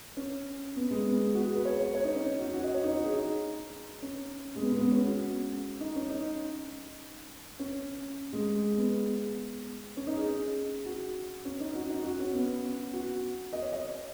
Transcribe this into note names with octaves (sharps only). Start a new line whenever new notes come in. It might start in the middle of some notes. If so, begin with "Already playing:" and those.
C#4
B3
G#3
B3
F#4
G#4
B4
C#5
C#5
C#5
D#4
C#4
D#4
F#4
F#4
D#5
C#5
D#4
F#4
G#4
D#4
C#4
G#3
B3
G#3
B3
C#4
F#4
D#4
C#4
D#4
C#4
G#3
B3
C#4
D#4
G#4
F#4
C#4
D#4
F#4
D#4
F#4
C#4
B3
F#4
D#5
C#5
D#5